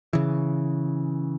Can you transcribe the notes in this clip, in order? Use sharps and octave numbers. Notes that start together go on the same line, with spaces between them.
C#3 E3